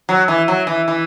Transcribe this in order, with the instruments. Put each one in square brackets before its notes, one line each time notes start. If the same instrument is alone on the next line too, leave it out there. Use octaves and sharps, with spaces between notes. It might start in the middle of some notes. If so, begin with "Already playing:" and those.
[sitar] F#3
E3
F#3
E3
E3